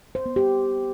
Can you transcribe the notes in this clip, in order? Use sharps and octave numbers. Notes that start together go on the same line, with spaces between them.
C5
B3
G4